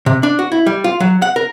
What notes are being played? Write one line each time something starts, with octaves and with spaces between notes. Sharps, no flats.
C3
D4
F#4
E4
G3
F4
F#3
F#5
A#4